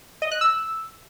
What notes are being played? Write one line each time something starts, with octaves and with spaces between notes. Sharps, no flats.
D#5
F#6
E6